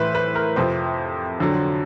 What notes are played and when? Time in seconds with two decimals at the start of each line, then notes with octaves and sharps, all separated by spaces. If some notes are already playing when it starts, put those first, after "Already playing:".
Already playing: A2 E3 B4 C5
0.15 B4
0.35 A#4
0.56 F2 C3 F3 C5
1.39 F2 D3 F#3